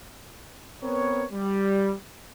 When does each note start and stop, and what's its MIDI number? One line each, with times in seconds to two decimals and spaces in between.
0.82 1.25 59
0.82 1.25 60
0.82 1.25 70
0.82 1.25 71
0.82 1.25 73
1.32 1.93 55